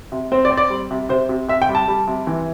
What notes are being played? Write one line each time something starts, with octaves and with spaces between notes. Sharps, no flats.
C3
C4 C5
D5
C4
D5
G3
C3
C3 C5
C3
C3 E5
G5
G3
A5
G3
C3
E3